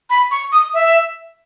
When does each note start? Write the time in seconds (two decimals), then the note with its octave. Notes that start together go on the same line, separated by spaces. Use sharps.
0.10 B5
0.31 C#6
0.52 D#6
0.74 E5